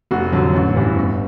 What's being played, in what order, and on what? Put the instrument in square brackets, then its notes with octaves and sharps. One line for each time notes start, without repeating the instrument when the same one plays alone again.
[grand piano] F1 F#4
F2 D3 F#3
A1
G2 E3
G1